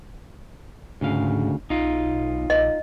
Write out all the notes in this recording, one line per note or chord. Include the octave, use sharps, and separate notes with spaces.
D2 G#2 C#3 F5
B1 D#4 F4
A#1 D#5